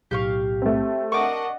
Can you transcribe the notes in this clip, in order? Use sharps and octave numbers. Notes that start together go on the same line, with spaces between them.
B1 A2 G4 F5 C#6
A3 C4
D4 A#4 D#5 F#5 C#6 D6